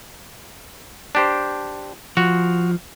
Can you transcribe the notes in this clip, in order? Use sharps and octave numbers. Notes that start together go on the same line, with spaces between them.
D4 G4 C5
F3 F#4